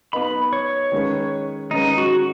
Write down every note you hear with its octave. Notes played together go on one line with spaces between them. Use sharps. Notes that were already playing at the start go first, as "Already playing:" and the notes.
B3 D#4 B4 D#5 B5
C#5
D#3 G#3 C#4 B4
D#3 G#3 C#4 D#4 B4
F#4